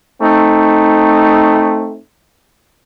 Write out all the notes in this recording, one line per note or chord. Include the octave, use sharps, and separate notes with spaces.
A3 C4 D#4